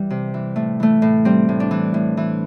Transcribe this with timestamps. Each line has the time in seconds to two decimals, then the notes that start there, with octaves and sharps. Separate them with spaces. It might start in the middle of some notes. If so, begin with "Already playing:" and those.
Already playing: E3 G3
0.10 C3
0.34 E3
0.56 A2 A3
0.80 E3 A3
1.02 A2
1.25 G3 C4
1.49 A2
1.60 D4
1.71 E3
1.94 A2
2.17 E3